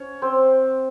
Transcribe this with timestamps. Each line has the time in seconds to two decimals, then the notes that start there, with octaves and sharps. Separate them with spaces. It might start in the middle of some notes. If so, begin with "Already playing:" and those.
Already playing: C#4 C#5
0.22 C4 C5